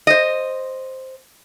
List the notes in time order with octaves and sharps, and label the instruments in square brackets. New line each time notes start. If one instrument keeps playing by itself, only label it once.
[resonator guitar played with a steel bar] C5 D#5